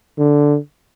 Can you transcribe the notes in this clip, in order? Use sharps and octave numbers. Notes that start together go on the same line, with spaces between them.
D3